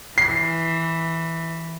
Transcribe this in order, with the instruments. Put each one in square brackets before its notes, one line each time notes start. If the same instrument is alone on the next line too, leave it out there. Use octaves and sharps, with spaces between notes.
[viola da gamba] E3 [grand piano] C7